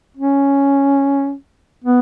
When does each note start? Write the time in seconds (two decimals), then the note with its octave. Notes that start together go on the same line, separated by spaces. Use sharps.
0.17 C#4
1.85 B3